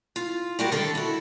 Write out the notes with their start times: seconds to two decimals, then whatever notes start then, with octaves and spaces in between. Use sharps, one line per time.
0.16 F4
0.59 G3 F#4 G4 A#4 F#5
0.72 D3 D#3 A3 D4 A4
0.95 E4 F#4